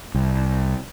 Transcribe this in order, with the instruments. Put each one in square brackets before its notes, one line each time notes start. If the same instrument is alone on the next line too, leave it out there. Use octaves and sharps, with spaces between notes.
[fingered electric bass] C2